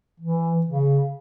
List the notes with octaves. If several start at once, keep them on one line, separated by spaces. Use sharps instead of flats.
E3
C#3